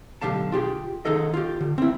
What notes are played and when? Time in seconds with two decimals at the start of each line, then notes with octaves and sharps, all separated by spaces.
0.21 B1 D3 F#3 G4 F5 A5
0.52 F4 G4 G#4
1.05 D#3 D#4 G#4 A4 D#5
1.34 F4 G4
1.61 D3
1.78 C4 E4